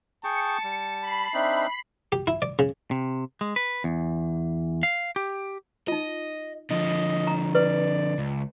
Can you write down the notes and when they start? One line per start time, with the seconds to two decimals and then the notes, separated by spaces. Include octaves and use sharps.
0.24 G#4 G5 A5 C#6 C#7
0.64 G3
1.02 B5 C7
1.34 C4 D4 D#4 E5
2.12 G4
2.27 E4
2.42 D5
2.59 C#3
2.91 C3
3.41 G#3
3.56 B4
3.84 E2
4.83 F5
5.16 G4
5.88 D#4 F4 D#5
6.71 D3 F3 D#5
7.27 A#5
7.55 B4 D5
8.18 C#2